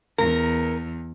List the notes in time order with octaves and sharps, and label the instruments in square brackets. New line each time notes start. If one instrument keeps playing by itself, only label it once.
[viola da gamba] E2 [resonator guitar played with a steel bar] A#4